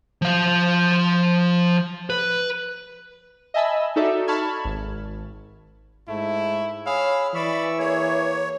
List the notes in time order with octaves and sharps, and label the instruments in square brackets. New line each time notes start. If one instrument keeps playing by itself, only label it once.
[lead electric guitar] F3 F5
B4
[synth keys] D#5 E5 G#5 A5 B5 E6
D#4 F#4 A4 D5 E5
A5 B5 C#6 F6 G#6
G#1
[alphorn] G#2 [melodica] A3 [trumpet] E4
[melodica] G#4 B5 E6 [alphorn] C#5 [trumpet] F5
[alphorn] E3 [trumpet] D5 [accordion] B5 [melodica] C#6 E6
[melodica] A#3 [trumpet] G#4 [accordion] C#5